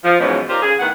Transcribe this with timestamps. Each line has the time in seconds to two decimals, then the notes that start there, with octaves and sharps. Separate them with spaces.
0.04 F3
0.20 E2 G#2 B2 F3 F#3 C#4
0.49 D#4 F4 G4 A#4 C5 D5
0.62 C#3 G#4
0.80 A2 D#3 B3 F#5